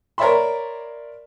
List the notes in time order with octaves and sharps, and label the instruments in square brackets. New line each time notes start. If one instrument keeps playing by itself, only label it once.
[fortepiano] A#4 C#5 D5 E5 B5 C6